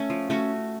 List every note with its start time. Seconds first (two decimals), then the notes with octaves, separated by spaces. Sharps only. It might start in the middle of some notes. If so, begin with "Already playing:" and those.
Already playing: A3 C#4
0.10 F3
0.30 A3 C#4 F#4